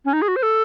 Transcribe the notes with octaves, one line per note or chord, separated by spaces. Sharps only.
C#4
D#4
G#4
F#4
C5
A4